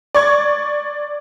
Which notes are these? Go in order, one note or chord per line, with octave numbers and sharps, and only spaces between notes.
D5 C#6 G#6